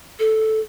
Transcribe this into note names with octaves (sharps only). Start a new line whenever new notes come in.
A4